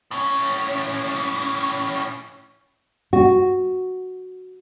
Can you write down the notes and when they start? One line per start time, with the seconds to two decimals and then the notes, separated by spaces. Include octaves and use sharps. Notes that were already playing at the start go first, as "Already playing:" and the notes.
0.11 A2 C#4
3.13 F#4